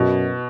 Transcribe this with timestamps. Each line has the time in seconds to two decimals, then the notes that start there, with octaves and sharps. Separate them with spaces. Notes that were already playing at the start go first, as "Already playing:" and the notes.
Already playing: F#2 B2